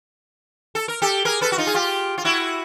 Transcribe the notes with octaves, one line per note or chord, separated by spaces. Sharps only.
A4
A#4
G4 A4
G#4 A#4
A4 B4
F#4
D#4 F4
G#4
F4 G4
F4
E4 F#4